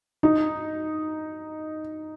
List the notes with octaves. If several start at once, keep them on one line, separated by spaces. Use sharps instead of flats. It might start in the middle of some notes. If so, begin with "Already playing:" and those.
D#4